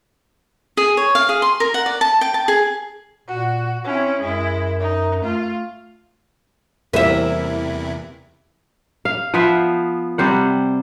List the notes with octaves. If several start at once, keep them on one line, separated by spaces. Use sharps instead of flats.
G#4
C#5
F5
G#4
C6
A#4
F#5
D5
A5
G5
A5
G#4
A#2 F#4
C4 C#4 E4
F#2 G#3 E4
D#4
A3 F4
E2 C3 E3 G3 A#3 E4 B4 E5
F5
F3 B3 C5 E5
C3 G3 C5 F#5